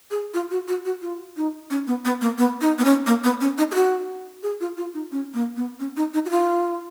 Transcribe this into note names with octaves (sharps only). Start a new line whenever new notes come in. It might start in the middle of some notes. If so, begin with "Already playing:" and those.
G#4
F4
F#4
F#4
F#4
F4
D#4
C#4
B3
B3
A#3
B3
D#4
B3
C#4
A#3
B3
C#4
D#4
G#4
F#4
G#4
F4
F4
D#4
C#4
A#3
B3
C#4
D#4
D#4
F#4
F4